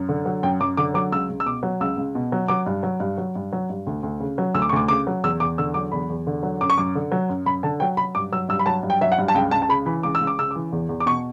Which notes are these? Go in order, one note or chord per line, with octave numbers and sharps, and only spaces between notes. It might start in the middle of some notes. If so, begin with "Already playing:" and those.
Already playing: F#2
D3
F#3
F#2 G5
F#2 D6
D3 D6
F#3 D6
C#2 E6
C#2
E6
B2 D6
F#3
C#2 E6
C#2
B2
F#3
F#3 D6
G2
F#3
G2
F#3
G2
F#3
G2
D2
D2
C#3
F#3
D2 E6
D6
C#6
D2 D6
C#3 D6
F#3
E2 E6
E2 D6
D3 E6
F#3 D6
E2 B5
E2
D3
F#3
F#2 D6
C#6
F#2 D6
D3
F#3
F#2
F#2 B5
D3 A5
F#3 G5
F#3 B5
G2 D6
F#3 E6
G2 E6
B5
F#3 A5
G2
G5
F#3 E5
F#5
G2
A5
C#2 G5
C#2 A5
A5
C#3 B5
E3 B5
C#2 D6
E6
C#2
D6
C#3 E6
D6
E3
E2
E2
D6
B2 C#6